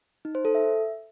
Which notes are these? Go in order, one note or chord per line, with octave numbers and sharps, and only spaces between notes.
D#4
C5
A4
E5